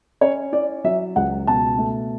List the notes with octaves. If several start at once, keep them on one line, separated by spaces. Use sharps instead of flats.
C#4 C#5
E4 D5
F#3 E5
C#2 F#5
B2 A5
A3